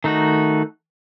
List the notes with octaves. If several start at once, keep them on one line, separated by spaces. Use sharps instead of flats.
D#3 A3 D#4 F#4